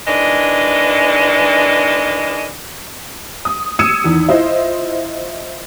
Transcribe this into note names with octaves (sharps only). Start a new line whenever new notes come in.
D#3 E3 G#3 D4 D#5
D#6
D#6 E6 G#6 C#7 D#7 E7
E2 D#3
E4 F4 C5 D#5